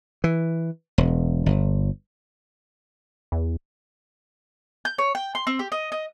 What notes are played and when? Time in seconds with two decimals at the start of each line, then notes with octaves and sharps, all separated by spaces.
0.24 E3
0.98 E1
1.46 G1
3.32 E2
4.85 G6
4.98 C#5
5.15 G5
5.35 C6
5.47 C4
5.59 G4
5.72 D#5
5.92 D#5